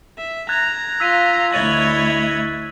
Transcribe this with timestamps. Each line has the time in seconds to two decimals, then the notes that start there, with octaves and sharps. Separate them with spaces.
0.18 E5
0.49 A#5 F#6 G#6 A6
1.00 F4 E6 B6 D#7
1.52 D2 E4 C#5 D#5 G#6 A6 D#7 F#7